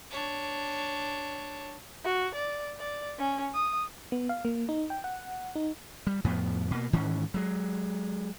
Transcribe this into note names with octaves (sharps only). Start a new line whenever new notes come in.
D4 C#5
F#4
D5
D5
C#4
D#6
B3
F5
A#3
D#4
G5
F#5
D#4
G3
F2 A2 F3 B3
B2 A#3
G#2 D#3 E3 C#4
F#3 G#3